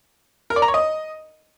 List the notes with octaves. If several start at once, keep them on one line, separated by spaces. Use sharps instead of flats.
A#4
D5
A#5
C#5
D#5